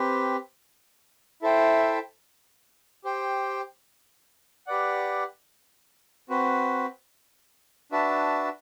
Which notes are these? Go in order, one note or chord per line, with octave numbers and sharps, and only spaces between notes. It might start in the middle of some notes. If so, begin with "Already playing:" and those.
Already playing: C4 G4 B4
E4 A4 C5 E5 G5
G4 C5 G5
G4 B4 D5 F#5
C4 F#4 B4
D4 F#4 B4 E5 A5